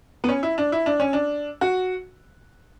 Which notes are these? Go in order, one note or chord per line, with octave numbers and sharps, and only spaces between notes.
B3
C#4
E4
D4
E4
D4
C#4
D4
F#4